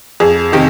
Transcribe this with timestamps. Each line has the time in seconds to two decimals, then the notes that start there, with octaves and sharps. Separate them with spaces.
0.20 F2 G#4
0.52 C3 D#3 G4